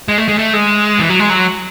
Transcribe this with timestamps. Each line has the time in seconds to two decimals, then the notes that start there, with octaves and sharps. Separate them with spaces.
0.08 G#3
0.18 A3
0.28 G#3
0.38 A3
0.53 G#3
1.00 E3
1.09 F#3
1.20 G#3
1.30 F#3